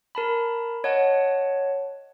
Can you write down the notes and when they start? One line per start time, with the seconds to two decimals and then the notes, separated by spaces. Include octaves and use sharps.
0.15 A#4 A5 B5
0.84 C#5 D#5 F#5 A5